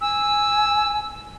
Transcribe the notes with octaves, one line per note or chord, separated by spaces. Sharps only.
G#5 E6